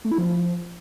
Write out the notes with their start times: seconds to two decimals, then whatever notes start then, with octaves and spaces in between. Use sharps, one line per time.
0.05 A3
0.11 E4
0.18 F3